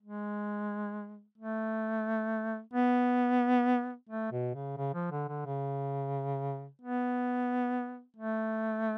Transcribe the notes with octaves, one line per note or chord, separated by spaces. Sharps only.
G#3
A3
B3
A3
B2
C#3
C#3
F3
D3
D3
C#3
B3
A3